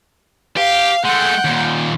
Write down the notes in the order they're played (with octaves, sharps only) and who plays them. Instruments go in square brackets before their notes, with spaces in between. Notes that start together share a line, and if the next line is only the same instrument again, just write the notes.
[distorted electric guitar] G4 [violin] F5
[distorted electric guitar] G#3 A3 [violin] F#5 G5
[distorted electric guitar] D#2 A#2